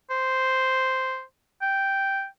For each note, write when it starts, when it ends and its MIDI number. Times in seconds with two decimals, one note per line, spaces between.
0.10 1.22 72
1.61 2.26 79